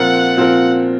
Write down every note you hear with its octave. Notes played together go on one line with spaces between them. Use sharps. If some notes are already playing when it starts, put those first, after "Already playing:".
Already playing: A#2 F3 C4 F4 A#4 F#5
A#2 F3 C4 F4 A#4